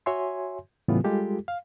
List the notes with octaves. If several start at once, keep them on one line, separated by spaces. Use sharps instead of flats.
F#4 C#5 E5 G#5 C6
A2 C#3 E3 G3 B3 F4
G3 G#3 F4 G4 A4
F5